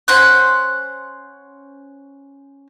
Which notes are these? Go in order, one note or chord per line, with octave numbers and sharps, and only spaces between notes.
C#4 C5 F#5 F#6